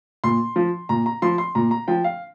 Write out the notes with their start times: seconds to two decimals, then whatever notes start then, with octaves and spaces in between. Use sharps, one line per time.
0.24 A#2 C6
0.56 F3
0.89 A#2 A#5
1.06 A#5
1.22 F3 C6
1.38 C6
1.55 A#2 A#5
1.71 A#5
1.88 F3 G5
2.04 F5